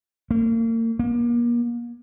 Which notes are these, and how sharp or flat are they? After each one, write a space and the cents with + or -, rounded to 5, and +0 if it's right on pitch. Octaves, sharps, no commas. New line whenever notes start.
A#3 -40
A#3 +35